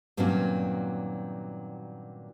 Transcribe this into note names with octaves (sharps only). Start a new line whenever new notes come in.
G2 A#2 D#3 F#3 C4 C#4